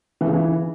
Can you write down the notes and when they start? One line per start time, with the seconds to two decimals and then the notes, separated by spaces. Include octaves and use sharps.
0.21 E3
0.27 C#3
0.33 E3